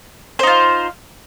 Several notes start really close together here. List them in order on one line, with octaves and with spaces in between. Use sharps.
C5 D#4 F4